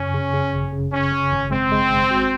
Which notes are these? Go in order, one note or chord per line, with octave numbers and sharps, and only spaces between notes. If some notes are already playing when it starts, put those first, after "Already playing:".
Already playing: F#2 C#3 C#4
C#3
C#3
G#1
C#3
C#3 C#4
C#3
G#1
G#3 C4
G#3
G#1
F#4